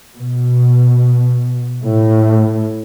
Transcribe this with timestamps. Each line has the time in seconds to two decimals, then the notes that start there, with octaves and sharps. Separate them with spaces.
0.18 B2
1.84 A2